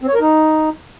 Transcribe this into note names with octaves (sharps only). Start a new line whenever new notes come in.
C4
C#5
A#4
D#4